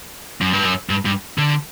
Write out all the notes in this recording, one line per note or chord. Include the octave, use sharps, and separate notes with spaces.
F#2
G2
F#2
G2
G2
D3